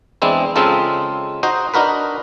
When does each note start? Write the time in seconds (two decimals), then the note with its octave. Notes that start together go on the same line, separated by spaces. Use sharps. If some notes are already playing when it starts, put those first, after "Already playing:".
0.22 E2 G#3 C4 D4 E4
0.56 C#3 G#3 C4 D#4 F4 A4
1.43 D#4 F#4 C5 D#5
1.74 D4 D#4 F#4 A#4 B4